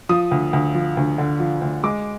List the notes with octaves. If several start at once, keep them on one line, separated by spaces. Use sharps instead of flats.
F3 D#6
D2
D2
F3
D2
D3
F3
D2
G#3 D6